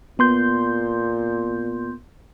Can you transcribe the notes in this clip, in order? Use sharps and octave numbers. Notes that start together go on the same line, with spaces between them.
A#2 B3 C6 G6